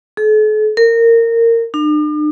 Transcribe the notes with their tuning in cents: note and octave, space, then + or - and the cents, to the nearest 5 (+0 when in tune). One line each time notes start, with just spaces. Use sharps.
A4 -45
A#4 -20
D4 +45